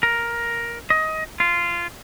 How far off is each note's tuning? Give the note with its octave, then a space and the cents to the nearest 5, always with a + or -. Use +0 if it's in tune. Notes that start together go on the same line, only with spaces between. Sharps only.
A#4 +10
D#5 +20
F4 -15